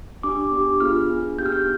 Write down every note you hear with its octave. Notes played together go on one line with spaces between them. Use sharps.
D4 G4 D6
B3 D4 G4
B3 F4 G#4 F6
D4 G#4
B3 D#4 G4 G6
F6
G6